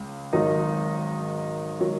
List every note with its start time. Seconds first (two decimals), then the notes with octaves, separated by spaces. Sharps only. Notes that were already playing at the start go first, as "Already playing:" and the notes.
Already playing: C#2
0.33 G#1 G#2 D#3 F#3 D#4
1.80 D#3 F#3